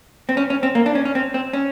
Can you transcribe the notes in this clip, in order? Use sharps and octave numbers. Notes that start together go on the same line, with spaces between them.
C4
C#4
C#4
C4
A#3
D4
C#4
C#4
C4
C4
C#4